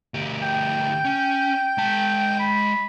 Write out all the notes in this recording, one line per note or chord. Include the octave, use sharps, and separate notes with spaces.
D2 G4
G5
C#4
G#3 A5
B5